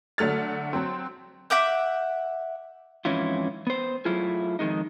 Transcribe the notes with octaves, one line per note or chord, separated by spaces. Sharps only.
D3 F#3 A3 F6 A6
F#3 C4
E5 F#5 D6 G6
F2 G#2 E3 C#4 E4 F4
B3 C5
F#3 A3 E4 F4 G#4
F2 D#3 G#3 D#4